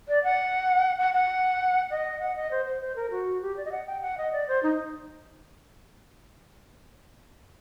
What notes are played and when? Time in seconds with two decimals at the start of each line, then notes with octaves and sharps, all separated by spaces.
0.08 D5
0.24 F#5
0.99 F#5
1.14 F#5
1.91 D#5
2.20 F#5
2.36 D#5
2.51 C5
2.66 C5
2.82 C5
2.96 A#4
3.11 F#4
3.42 G4
3.57 D5
3.65 D#5
3.72 F#5
3.87 G5
4.02 F#5
4.18 D#5
4.32 D5
4.48 C5
4.63 D#4